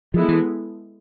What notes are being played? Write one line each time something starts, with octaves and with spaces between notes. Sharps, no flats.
F3 G#3 B3 E4 A4
E3